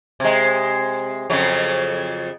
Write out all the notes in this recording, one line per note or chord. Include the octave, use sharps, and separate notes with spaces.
C3 G#3
F2 C#3 F#3